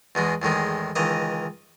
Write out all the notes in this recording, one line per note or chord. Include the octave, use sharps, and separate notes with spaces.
E2 B2 G#3
E2 A2 D#3 G#3
C#2 D#3 E3 D#5